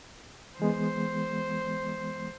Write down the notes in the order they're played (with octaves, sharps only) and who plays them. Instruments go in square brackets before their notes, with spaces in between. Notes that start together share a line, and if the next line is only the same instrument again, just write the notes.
[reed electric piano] E3 G#3 B3 [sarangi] C5